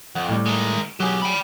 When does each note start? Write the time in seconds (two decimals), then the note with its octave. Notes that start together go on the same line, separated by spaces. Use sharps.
0.15 F2 F#5
0.29 A2 G3
0.46 D#3 G#3
1.00 B1 F#3 G4 G#4
1.22 G5 B5